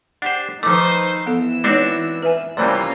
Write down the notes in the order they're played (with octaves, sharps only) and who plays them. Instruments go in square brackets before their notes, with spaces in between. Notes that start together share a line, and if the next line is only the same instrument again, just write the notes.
[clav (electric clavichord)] D4 G4 C5 [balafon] F#5
[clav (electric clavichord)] D#3 A3 [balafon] F3 D6 [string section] D#4 B4 C5
[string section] E3 E6 [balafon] B3 A4
[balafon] G#3 D#4 C#5 [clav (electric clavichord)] C4 D4 F#4
[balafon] B4 E5 G#5
[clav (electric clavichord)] C3 E3 G3 [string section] A#3 C#4 F4 [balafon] C5 D5